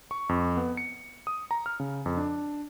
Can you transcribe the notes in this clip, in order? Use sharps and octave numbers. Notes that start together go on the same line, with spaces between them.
C#6
F2
B3
C#7
D#6
A#5
F6
C#3
F2
D4